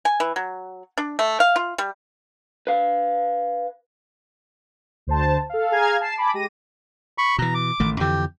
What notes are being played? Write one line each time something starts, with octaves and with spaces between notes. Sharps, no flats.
G#5
E3
F#3
D4
A3
F5
F4
G3
B4 F5
D2 C5 A5
A4 F5
G#4 F5 G#5 A#5 F6 G#6
A5 C7 E7
G#5 A5 B5 D6
G#3 G4 A#6 D#7
B5 C#6
B2 E3 A#5
D6
A1 D#3 A3
F2 D3 E3 G4